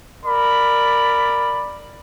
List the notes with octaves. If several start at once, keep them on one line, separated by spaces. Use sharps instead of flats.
A#4 D5 B5